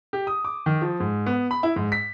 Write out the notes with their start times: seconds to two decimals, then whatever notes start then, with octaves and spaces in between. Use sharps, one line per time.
0.13 G4
0.27 D#6
0.45 D6
0.66 D#3
0.82 F3
1.00 G#2
1.26 B3
1.51 B5
1.63 E4
1.76 G#2
1.92 B6